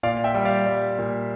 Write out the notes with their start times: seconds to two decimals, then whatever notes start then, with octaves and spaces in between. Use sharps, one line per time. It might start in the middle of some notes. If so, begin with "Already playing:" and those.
0.03 A#2 D5 F5
0.24 E5 G5
0.35 G3
0.45 D5 F5
0.66 G3
0.99 A#2